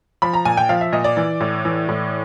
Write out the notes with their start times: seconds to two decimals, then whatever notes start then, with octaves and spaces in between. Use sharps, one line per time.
0.22 F3 B5
0.34 A#5
0.45 A#2 G#5
0.57 G5
0.69 F3 F5
0.81 E5
0.92 A#2 D#5
1.04 D5
1.17 E3
1.41 A2
1.65 E3
1.89 A2